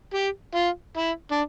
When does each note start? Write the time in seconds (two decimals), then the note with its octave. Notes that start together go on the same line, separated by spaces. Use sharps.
0.14 G4
0.55 F4
0.97 E4
1.31 D4